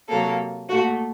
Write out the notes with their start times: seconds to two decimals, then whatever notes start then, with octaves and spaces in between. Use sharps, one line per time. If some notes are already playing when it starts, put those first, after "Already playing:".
0.09 C3 F#3 A#3 A4
0.69 A#2 A3 F#4